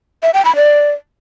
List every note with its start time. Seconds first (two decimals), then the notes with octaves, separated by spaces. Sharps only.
0.23 E5
0.34 G5
0.45 B5
0.56 D5